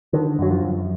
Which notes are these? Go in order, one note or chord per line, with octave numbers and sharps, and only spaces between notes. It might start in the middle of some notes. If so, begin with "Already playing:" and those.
D3 D#3
F#2 F#3
F3
F#2